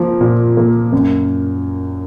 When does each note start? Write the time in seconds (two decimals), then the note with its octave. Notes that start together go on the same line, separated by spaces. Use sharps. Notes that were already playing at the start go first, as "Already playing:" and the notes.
Already playing: F3 A#3
0.21 A#2
0.57 A#3
0.92 F#2